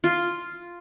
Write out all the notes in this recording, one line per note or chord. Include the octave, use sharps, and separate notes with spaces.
F4